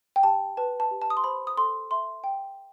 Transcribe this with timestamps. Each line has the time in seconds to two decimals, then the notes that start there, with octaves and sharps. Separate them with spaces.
0.16 G5
0.23 G4 A5
0.57 B4 A5
0.80 A5
0.91 G4
1.02 A5
1.10 D#6
1.17 C6
1.24 C5 B5
1.47 D#6
1.57 A4 C6
1.91 E5 C6
2.24 G5